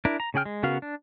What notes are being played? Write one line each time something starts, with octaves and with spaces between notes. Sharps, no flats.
D4 E4 A#4
A#5
C#3 C#4 G#4 G5 F6
G#3
C#3 B3 F#4 A#4 F5
D4